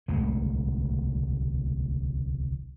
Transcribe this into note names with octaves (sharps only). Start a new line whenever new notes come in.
D1 C2 G#3 A3